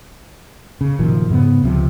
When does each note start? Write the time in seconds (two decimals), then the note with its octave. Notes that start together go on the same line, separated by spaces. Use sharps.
0.81 C#3
0.99 F#1 A#2 D#3 F3
1.30 G#2 C#3 A#3 B3
1.63 C#2 C3 F3